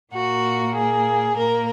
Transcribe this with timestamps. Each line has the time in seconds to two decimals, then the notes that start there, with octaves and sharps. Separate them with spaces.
0.13 A#2 A#3 F#4
0.75 G#4
1.36 A#2 A#3 A#4